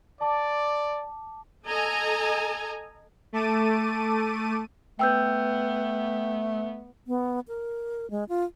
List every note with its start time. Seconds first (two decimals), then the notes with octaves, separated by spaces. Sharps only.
0.21 D5 A5 D6
1.66 A4 D#5 G#5 A#5
3.33 A3 A5 D6 D#7
4.99 A3 B3 G5 E6 G6
7.07 B3
7.48 A#4
8.11 G#3
8.29 F4